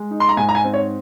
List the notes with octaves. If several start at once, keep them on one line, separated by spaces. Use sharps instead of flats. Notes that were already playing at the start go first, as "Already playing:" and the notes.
Already playing: G#3
D#4
C6
A#5
G#2 G#5
A#5
G#5
C4
C#5